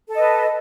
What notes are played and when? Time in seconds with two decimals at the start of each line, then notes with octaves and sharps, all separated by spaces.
0.09 A4
0.13 D#5
0.18 B4